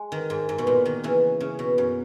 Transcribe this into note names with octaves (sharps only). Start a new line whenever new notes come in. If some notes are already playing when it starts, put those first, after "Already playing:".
Already playing: G#3
D#3
G#2
G#2
B2
A#2
D#3
C#3 E3
C#3
B2
F#2